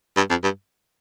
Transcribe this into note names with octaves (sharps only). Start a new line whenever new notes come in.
G2
F2
G2